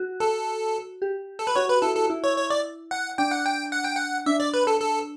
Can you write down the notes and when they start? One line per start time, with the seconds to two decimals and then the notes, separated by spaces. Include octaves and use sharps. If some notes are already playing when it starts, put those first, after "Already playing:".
Already playing: F#4
0.20 A4
1.02 G4
1.39 A4
1.47 B4
1.56 F#4 C#5
1.69 B4
1.82 E4 A4
1.96 A4
2.10 E4
2.24 C#5
2.37 C#5
2.50 D5
2.91 F#5
3.18 D4 G5
3.31 F#5
3.46 G5
3.72 F#5
3.84 G5
3.97 F#5
4.26 D4 E5
4.40 D5
4.54 B4
4.67 A4
4.80 A4